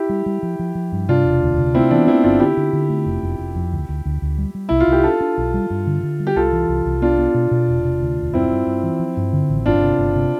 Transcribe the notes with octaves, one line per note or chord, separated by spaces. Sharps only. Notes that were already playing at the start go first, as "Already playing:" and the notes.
Already playing: E4 G4
G3
G3
F3
F3
F3
G2
C3 D4 F4
E1
D2
C3
A3 C4 E4
E3 B3 D4
A3 C4 E4
G1 D4 F4
D3 E4 G4
D3
D3
A3
F1
F1
F1
F2
D2
D2
D2
D2
G3
G3
C2 E4
F4
C2 G4
D4 F4 A4
D4
B1
G3
G2
D3
D3
G3
G4
C2 F4 A4
E3
C2
C2
B3 D4 F4
B3
B2
B2
E1
C3
D2
E1
G2 C4 E4
G2
G2
E3
F3
G2
D3
A1
G1 D4 F4
C3
G1
C3